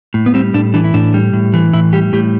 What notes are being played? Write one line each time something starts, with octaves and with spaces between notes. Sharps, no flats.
A2
B3
G3 C4
A2 D4
E3 D4
E4
A2 D4
G3
A2
E3
A2 E4
G3 G4
A2 G4